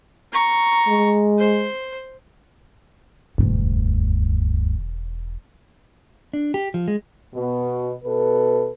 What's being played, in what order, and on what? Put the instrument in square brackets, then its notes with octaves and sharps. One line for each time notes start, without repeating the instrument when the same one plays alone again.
[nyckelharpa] A#5 C#6
[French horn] G#3
[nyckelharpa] C5
[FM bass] E1 [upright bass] D2 G2
[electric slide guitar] D4
G4
F3
G#3
[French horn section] B2
B2 A4 B4